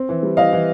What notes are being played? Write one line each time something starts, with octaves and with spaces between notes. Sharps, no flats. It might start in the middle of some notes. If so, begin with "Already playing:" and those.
Already playing: C4
E3
G3
E3 D#5 F5
E3